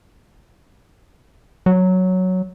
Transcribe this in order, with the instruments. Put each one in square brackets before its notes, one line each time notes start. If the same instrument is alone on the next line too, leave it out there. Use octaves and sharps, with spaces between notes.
[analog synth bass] F#3